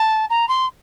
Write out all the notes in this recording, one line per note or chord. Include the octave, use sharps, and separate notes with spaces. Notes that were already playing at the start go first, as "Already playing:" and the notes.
Already playing: A5
A#5
C6